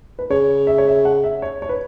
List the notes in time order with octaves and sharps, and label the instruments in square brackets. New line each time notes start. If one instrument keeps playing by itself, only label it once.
[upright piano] B4
[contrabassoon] C#3 [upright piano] C#5
[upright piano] E5
C#5
E5
F#5
E5
C#5
C#5
B4